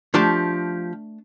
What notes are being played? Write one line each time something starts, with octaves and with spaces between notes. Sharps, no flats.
F3 A3 D4 G4 A5